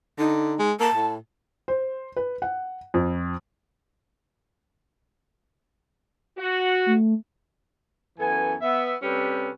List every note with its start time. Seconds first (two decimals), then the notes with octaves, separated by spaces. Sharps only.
0.18 D3 D#4
0.59 G#3
0.80 A#3 A5
0.95 A2
1.68 C5
2.16 B4
2.42 F#5
2.94 F2
6.38 F#4
6.86 A3
8.19 F#2 E3 B3 A4 G#5
8.62 B3 E5
9.02 C3 G3 C#4 G4 A4 B4